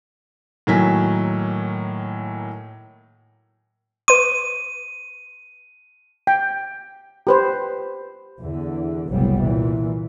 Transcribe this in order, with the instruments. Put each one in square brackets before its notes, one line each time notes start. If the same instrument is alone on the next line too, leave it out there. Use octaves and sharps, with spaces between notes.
[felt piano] A2 D#3 F#3 A#3 G#5 B6
[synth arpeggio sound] B4 C6 [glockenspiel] D#7
[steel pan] G5
G4 B4 C5
[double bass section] E2 D3 E3
F#1 C2 A2 F#3 G3 B3
A#2 E3